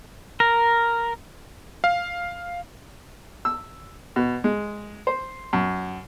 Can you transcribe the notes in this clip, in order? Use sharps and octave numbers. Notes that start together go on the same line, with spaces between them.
A#4
F5
E6
B2
G#3
C5
F#2